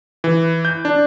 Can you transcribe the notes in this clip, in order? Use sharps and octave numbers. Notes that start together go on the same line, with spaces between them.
E3
G6
D4